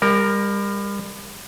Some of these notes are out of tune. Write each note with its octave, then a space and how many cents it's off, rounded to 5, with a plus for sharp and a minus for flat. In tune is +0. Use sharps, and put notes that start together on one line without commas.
G3 +35 A#4 +0